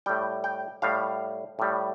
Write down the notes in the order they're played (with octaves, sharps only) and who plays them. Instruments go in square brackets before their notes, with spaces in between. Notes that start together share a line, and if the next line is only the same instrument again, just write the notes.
[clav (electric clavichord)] A2 G3 G5
G5
A2 G3 F5
A2 G3